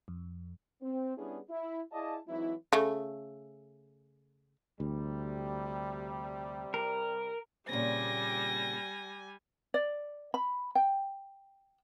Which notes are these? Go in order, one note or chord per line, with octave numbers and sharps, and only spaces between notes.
F2
C4
G3 B3 C#4 D4 E4 G#4
E4
E4 G#4 D5 D#5 F5 A5
E3 F#3 G#3 C4 D#4 E4
C#3 A3
D2 C3 G3
A#4
A#2 C#3 G3 C4 G#5 A#6
D5
B5
G5